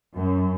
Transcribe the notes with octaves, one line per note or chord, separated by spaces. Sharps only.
F#2